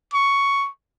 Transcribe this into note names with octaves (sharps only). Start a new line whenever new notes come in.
C#6